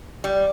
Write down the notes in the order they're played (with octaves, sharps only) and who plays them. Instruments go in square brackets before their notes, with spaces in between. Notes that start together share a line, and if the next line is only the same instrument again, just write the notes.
[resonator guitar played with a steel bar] G3